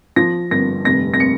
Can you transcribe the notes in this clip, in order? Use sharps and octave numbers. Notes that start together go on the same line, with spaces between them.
F3 A#6
G1 A#6
F1 A#6
A#6
C#7